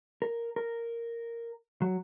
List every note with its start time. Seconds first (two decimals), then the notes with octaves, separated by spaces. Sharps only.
0.22 A#4
0.56 A#4
1.82 F#3